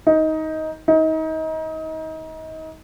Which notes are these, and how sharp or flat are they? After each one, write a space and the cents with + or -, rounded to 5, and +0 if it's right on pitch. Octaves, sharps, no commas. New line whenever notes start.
D#4 +15
D#4 +30